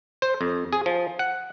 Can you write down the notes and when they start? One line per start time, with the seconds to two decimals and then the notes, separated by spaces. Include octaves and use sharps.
0.22 C5
0.41 F2
0.73 G#4
0.86 F3
1.19 F#5